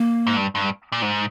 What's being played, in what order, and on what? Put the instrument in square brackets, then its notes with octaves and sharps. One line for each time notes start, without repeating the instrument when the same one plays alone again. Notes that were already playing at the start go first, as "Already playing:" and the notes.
Already playing: [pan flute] A#3
[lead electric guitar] G#2
G2
G2
A#2
G#2